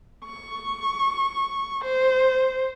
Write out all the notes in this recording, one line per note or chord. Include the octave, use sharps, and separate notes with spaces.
C#6
C5